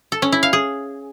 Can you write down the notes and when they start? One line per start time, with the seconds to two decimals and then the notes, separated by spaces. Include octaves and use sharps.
0.12 A4
0.22 C#4
0.32 E4
0.43 F5
0.53 G#4